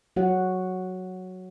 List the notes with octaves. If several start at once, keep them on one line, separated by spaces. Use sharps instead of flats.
F#3 F#4 C#5 F#5